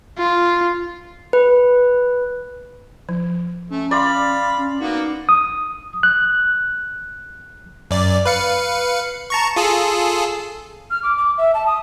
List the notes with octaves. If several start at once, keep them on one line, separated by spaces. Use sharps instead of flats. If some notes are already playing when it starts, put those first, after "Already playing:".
F4
B4
F3
A3 C#4
D5 F5 B5 C6
C#4
A#3 B3 D#4 F#4
D#6
F#6
F#2 D5
B4 F5 C#7
A5 A#5 C#6
F4 G#4 A4
F6
D6
D6
E5
A5
D#6